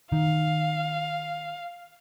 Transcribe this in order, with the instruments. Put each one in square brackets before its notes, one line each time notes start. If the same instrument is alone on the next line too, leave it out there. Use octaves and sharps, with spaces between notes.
[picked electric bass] D#3 [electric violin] F5